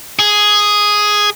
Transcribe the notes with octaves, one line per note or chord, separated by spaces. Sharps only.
G#4